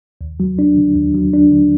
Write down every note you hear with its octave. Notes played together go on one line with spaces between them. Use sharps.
D#2
F#3
D4
D3
D#2
F#3
D4
D3